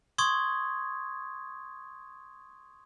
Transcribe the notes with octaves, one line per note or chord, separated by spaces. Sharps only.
C6 C#6 D#6 G#6